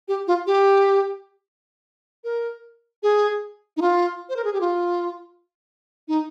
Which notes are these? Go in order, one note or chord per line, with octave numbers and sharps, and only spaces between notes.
G4
F4
G4
A#4
G#4
D#4
F4
C5
A#4
G#4
G4
F4
D#4